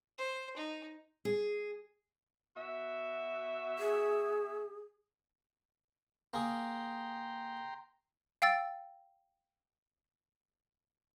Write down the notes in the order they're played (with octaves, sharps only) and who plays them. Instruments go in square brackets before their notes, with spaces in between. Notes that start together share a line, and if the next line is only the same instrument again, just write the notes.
[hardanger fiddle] C5
D#4
[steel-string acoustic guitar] G#4
[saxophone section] B2 F#4 E5
[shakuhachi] G#4
[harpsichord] A#3 G#4 [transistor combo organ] G5 A#5 C6
[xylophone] F5 G5 E6 A6